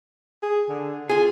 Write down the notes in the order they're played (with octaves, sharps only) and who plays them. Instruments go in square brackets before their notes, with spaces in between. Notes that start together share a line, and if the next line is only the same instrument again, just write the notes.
[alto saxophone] G#4
D3
[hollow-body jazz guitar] F4 G#4 [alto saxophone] G#5